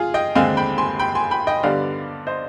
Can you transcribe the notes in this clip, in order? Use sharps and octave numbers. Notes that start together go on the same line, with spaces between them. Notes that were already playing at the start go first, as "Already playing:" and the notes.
Already playing: F4 G#4
D#5 G5
D#2 D3 G#3 C4 F5 G#5
G5 B5
G#5 C6
G5 B5
G#5 C6
G5 B5
D#5 G5
G2 D3 G3 B3 D4 D5 F5
C5 D#5